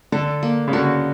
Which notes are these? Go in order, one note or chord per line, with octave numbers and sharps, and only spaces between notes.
D3 A4
A#3
C#3
D3 F#4